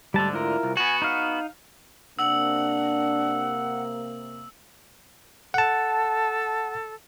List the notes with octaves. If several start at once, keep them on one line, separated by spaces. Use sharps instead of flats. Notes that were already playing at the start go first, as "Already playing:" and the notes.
D2 G#2 D3 G3 A5
E4 F4 A#4
C2
B3 F#4 G#5
D#4 F5
C3 A#3 D4 F#5 E6 F#7
A4 F#5 A5